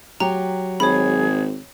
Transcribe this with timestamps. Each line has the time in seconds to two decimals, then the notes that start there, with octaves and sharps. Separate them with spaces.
0.20 F#3 G4 A#5
0.80 G#1 G#4 C#5 B5